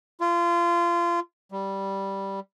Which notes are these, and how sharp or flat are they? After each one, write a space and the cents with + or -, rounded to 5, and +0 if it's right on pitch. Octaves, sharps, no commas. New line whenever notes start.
F4 -25
G3 -5